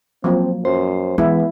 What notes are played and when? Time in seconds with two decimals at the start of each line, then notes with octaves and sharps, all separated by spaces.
0.24 F3 F#3 A#3 C4
0.65 F#2 C5
1.18 E3 G#3 B3 E4